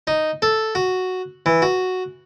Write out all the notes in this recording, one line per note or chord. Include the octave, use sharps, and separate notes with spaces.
D#4
A4
F#4
E3
F#4